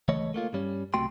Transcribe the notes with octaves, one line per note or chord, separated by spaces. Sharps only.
C#2 E3 A3 C#5 D#5
A3 A#3 F4
G2 G3 C#4
B1 C3 A3 F#4 G5 C6